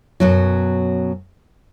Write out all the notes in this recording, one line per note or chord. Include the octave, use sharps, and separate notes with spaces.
F#2 B2 F#3